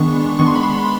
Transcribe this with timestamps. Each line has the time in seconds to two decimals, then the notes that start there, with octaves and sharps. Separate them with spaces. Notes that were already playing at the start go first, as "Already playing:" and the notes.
Already playing: D#3 G#3 B3 D4 C#6
0.39 D#3 G#3 B3 D4 C#6
0.47 C6
0.55 B5
0.63 C6